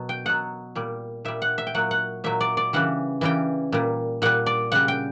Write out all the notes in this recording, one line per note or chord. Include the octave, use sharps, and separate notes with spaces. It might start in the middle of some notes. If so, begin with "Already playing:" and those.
Already playing: B2 F#3
G5
B2 F#3 F#5
A#2 G3
A#2 G3 E5
F#5
E5
G5
A#2 F#3 F#5
F#5
A#2 F#3 E5
D5
D5
C#3 E3 G3 F#5
C#3 E3 G3 G5
A#2 G3
A#2 G3 F#5
D5
C#3 G3 F#5
G5